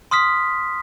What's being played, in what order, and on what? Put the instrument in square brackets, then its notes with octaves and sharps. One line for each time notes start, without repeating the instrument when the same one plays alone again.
[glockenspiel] C6 D#6 F6 B6